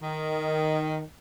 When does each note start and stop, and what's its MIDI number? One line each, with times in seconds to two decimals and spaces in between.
0.02 1.02 51